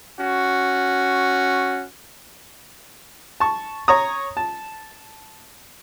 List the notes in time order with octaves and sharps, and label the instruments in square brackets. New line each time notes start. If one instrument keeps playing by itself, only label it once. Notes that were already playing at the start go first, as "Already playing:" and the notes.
[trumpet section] C#4 F#4
[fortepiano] A5 C#6
C#5 A#5 D#6
A5